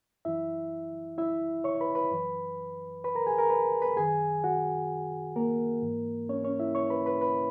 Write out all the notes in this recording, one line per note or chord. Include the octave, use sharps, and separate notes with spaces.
F#2 E3 E4 E5
E4 E5
C#5 C#6
B4 B5
B4 B5
F#2 E3
B4 B5
A#4 A#5
G#4 G#5
A#4 A#5
B4 B5
B4 B5
F#2 D#3 G#4 G#5
F#4 F#5
A#3 A#4
G#2 E3
C#4 C#5
C#4 C#5
E4 E5
C#5 C#6
B4 B5
B4 B5
B4 B5